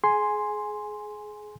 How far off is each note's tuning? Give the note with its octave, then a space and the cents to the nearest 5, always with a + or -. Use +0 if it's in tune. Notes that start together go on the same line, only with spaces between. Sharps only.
G#4 +25 G#5 +0 C6 +0